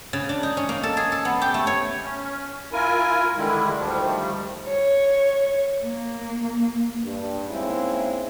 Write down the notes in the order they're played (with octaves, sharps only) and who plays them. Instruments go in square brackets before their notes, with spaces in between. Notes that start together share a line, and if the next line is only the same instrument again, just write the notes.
[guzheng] C#3
D4
D#4
C#4
A#3
A4
G#4
A4
B3
G4
A3
C#5
[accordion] C#4
E4 F4 A#4 G#5
D3 D#3 G3 G#3 E4
D2 D#3 F3 G3
[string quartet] C#5
A#3
[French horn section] G2
G#3 A#3 C4 C#4 D#4 E4